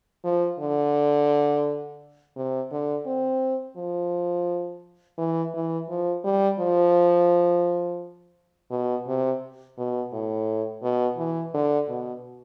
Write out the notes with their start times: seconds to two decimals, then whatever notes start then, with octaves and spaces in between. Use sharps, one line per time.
0.25 F3
0.60 D3
2.36 C3
2.72 D3
3.06 C4
3.77 F3
5.18 E3
5.54 E3
5.89 F3
6.24 G3
6.59 F3
8.71 B2
9.07 C3
9.78 B2
10.13 A2
10.83 B2
11.18 E3
11.54 D3
11.88 B2